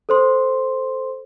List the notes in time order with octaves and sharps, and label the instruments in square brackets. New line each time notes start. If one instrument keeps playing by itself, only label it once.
[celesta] A4 C5 C6